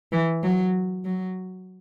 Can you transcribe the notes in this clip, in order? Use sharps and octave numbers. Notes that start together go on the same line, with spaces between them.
E3
F#3
F#3